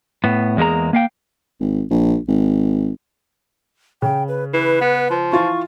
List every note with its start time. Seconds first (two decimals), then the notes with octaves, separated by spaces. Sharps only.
0.24 A2 B3
0.57 E2 G#3 A#3 G#4 A#5
0.93 A#3 F5 G5
1.60 G#1
1.90 A#1
2.28 G#1
4.02 C#3 G5
4.28 B4
4.53 E3 B4
4.81 B3
5.10 F3
5.32 E3 F4 C#6 A6